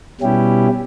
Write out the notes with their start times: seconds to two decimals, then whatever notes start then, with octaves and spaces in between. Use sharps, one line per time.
0.21 B2 G3 C#4 E4 G4